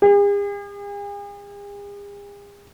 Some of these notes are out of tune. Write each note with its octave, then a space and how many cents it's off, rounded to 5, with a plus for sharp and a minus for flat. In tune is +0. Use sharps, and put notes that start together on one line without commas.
G#4 -45